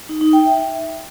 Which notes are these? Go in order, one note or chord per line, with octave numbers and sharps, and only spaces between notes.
D#4
D#4
G5
E5